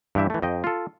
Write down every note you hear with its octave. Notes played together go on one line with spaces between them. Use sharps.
G2 E3 G4 E5
E3 A3
F2 D#5 G5
F4 A4